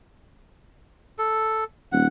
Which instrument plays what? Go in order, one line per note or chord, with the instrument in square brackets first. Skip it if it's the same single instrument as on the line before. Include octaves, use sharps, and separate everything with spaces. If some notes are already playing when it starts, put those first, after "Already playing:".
[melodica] A4
[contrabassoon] D#1 [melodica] F#5